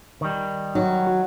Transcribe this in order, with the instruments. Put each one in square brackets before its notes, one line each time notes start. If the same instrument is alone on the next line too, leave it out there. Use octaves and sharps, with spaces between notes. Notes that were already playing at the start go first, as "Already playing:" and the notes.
[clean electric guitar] D#3 G3
[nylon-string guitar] F#3 [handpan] D#4
[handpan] F#4